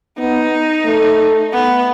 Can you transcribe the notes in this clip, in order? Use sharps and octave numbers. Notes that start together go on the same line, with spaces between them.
B3 D#4
A3
B3